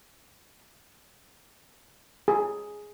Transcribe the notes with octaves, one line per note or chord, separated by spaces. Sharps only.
G#4